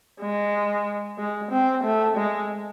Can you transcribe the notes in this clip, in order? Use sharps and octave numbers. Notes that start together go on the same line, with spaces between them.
G#3
G#3
C4
A3
G#3